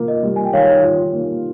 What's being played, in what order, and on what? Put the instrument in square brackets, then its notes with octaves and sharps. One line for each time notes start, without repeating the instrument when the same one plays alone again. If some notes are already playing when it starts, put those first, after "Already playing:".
Already playing: [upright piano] A#3 F4
[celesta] D#5
[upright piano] G3
[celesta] G#5
G5
[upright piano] D#3 [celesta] C#5 F5
[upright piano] F4
A#3